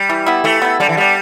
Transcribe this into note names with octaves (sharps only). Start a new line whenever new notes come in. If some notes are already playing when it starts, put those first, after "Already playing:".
Already playing: G3
E3
B3 E4
E3 A3
B3 E4
D3 G3
E3
G3 B3 D4